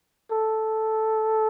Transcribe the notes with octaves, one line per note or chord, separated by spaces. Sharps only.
A4